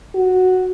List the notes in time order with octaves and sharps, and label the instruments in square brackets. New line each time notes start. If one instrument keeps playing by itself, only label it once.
[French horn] F#4